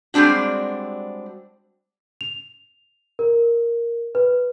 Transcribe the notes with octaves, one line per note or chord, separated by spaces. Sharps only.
G3 G#3 C4 D4 F#4
F7
A#4
B4